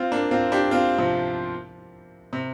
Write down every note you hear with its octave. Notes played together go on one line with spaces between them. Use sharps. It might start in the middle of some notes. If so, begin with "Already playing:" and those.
Already playing: C4 F4
A#3 D4
C4 F4
D4 G4
C4 F4
C3 F3
C3